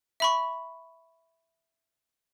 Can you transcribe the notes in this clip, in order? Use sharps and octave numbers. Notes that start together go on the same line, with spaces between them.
E5 B5 C#6